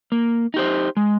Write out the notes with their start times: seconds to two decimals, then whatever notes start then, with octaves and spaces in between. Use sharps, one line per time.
0.12 A#3
0.54 D#4 G4 C5
0.97 G#3